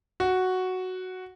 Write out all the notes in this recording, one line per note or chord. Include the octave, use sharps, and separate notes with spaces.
F#4